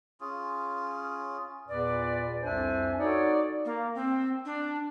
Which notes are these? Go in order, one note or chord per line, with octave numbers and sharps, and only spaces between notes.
C#4 F4 G#4
E2 A#2 B4 D5
C2 F2 D4 C5 E5 G#5
D#4 F#4 A4 C#5 D5
A#3
C4
D4